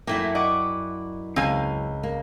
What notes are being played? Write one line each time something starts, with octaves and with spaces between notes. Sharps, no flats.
F#2 A3 A#3 E4 G5
D5 D#5 F#5 C#6 D6
C#2 C4 F5 G#5
A#3